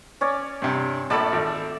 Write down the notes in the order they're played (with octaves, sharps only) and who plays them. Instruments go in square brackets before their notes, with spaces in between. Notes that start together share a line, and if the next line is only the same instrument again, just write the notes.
[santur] C#4 C#5 D5
[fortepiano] G2 C3
[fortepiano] A#1 A5 B5 [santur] A3 A4 D5
[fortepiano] G#1